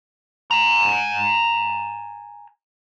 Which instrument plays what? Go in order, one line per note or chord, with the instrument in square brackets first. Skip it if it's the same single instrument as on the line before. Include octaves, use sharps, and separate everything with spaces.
[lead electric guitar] G#5 A#5